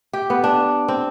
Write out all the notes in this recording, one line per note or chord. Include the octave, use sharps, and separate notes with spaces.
G4
B3
D4
C4